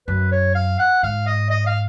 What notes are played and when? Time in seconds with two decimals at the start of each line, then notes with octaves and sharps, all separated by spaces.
0.07 F#2 B4
0.31 C#5
0.55 F5
0.79 F#5
1.03 G#2 F5
1.26 D#5
1.50 D#5
1.67 F5